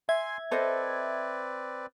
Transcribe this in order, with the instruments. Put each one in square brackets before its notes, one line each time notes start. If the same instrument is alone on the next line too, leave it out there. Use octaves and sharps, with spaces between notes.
[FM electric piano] E5 G#6 [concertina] G#5 C6
[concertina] C4 B4 D5 [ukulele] A4 C5 D#5